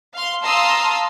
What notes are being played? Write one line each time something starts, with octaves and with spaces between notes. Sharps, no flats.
F5 C6
F5 A5 A#5 C6 D#6 E6